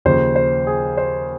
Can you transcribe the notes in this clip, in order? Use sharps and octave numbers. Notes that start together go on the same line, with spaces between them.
D#2 C#3 F3 C5
C5
G#4
C5